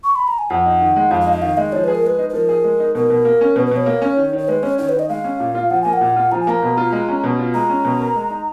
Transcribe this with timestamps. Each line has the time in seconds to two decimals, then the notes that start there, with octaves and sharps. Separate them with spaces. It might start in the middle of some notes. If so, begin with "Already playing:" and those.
0.04 C#6
0.16 B5
0.28 A#5
0.39 G#5
0.50 F2 F#5
0.66 D#4
0.81 D#3
0.96 G#3
1.11 F2 F5
1.21 F5
1.27 D#4
1.32 D#5
1.42 D#3 F5
1.57 G#3 D#5
1.72 F3 C#5
1.84 G#4 B4
1.95 A#4
2.03 G#3 B4
2.19 D#4
2.30 B4
2.33 F3 A#4
2.49 G#4
2.64 G#3
2.80 D#4
2.95 B2 A#4
3.10 B2
3.25 A#3
3.41 C#4
3.56 B2 B4
3.66 B4
3.71 B2 C#5
3.86 A#3
4.02 C#4
4.17 D#3
4.33 D#3
4.38 C#5
4.48 G#3 B4
4.63 C#4 C#5
4.78 D#3 C#5
4.89 D#3 B4
4.99 D#5
5.09 G#3 F5
5.24 C#4
5.40 A#2
5.55 F4
5.70 F3 F#5
5.82 A#3 G#5
5.93 F#5
6.01 A#2
6.16 F4
6.32 F3 A#5
6.41 G#5
6.47 A#3 A#5
6.63 B2
6.77 F4
6.92 G#3
7.09 C#4
7.24 B2
7.39 F4
7.54 G#3 A#5
7.69 C#4
7.85 B2
8.00 A#4
8.16 G#3
8.30 D#4